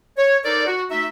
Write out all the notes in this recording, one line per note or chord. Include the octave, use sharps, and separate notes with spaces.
C#5
D#4 A4 A#4 C5 D5
F#4
A3 D#4 F#4 E5